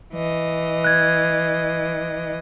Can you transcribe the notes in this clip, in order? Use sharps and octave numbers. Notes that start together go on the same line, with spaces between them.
E3 D#5
F#6 G#6